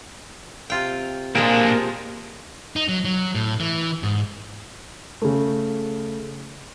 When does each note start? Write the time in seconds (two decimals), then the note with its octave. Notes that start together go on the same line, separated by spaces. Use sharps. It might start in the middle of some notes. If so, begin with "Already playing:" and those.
0.70 C3 F4 G5
1.35 A#2 F3 G#3 A#3 D4 G4
2.76 D#4
2.89 F#3
3.04 F#3
3.35 A2
3.60 E3
4.03 G#2
5.22 C#3 A3